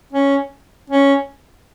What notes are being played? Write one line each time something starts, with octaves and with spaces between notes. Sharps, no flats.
C#4
C#4